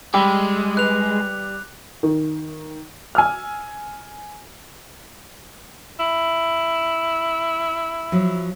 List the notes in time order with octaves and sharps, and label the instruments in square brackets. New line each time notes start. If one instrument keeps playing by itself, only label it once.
[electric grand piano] G3 [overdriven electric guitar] G#3 [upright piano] G5 B5 E6 [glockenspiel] D6
[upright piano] B4 [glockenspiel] F#6 F7
[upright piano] D#3
G#5 E6 F6
[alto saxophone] E4
[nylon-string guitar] F3 F#3